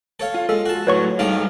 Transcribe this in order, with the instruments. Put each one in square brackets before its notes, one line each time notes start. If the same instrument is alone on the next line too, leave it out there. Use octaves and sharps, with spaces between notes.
[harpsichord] A4 C#5 F5
[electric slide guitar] F4
[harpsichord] G#3 [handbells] A4
[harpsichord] F#4 A5
[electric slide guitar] A2 F#3 [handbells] B4 C#5 C#6
[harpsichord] G#2 A4 D5 [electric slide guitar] G3 D#4 F5